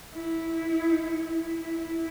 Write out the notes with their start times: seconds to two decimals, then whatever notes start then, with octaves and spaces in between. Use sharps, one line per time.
0.14 E4
1.18 E4